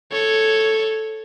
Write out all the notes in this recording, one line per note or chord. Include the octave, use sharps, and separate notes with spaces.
A4 C#5